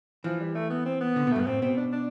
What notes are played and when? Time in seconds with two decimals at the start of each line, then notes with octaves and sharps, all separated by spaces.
0.24 E3 F3
0.40 G3
0.55 A3
0.70 B3
0.85 C4
1.01 B3
1.16 D3
1.27 B2
1.31 A3
1.36 G2 B3
1.46 A2 C4
1.62 B2 C4
1.77 D4
1.92 D4